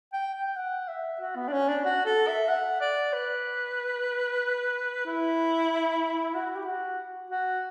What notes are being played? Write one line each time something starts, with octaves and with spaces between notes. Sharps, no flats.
G5
G5
F#5
E5
F#4
B3
D4
C#4
D4
F#4
A4
E5
F#5
D5
B4
E4
F#4
G4
F#4
F#4